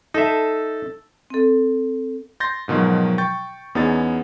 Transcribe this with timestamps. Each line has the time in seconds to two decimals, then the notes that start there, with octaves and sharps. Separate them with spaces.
0.14 D#4 A4 E5
1.30 C4 A4
2.40 C6 G6 A6 A#6
2.68 G#2 B2 D#3 F3 F#3
3.18 G5 C#6 G6 A6
3.75 E2 B3 C#4 D#4 G#4 A6